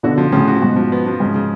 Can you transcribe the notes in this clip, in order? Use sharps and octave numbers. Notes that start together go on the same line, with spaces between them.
B2 D3 F#4
F3
A2 C#3 F3
F#4
G#2 B2 F#4
F3
B3
F3
G#2 C#3
C#3